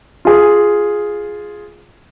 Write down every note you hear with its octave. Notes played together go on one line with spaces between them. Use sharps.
F4 G#4